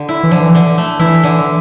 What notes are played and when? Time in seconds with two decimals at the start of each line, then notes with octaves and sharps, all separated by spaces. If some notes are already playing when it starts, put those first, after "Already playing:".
Already playing: D3 G4
0.09 E4
0.23 E3
0.31 D3 F3
0.39 E3
0.55 D3
0.78 A3
1.00 E3 E4
1.24 D3